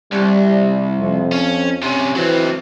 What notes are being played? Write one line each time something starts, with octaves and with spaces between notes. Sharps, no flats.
C2 G3
F2
C#4
C3 C#4
E3 F#3 C4